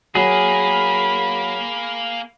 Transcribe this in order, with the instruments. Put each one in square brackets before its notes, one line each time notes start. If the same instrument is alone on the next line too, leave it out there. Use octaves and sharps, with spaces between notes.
[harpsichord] F#3 [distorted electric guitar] A#3 [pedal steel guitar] G#4 [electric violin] B5